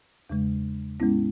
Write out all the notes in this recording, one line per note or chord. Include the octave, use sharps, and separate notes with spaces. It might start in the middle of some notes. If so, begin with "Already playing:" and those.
E2 C#3 G#3
A2 G#3 B3 C#4 E4